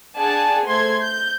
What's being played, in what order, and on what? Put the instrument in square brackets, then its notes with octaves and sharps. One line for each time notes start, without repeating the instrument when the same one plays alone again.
[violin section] D4 G#4 D5 F#5 G#5 A5
A3 C5 C6 G#6
G6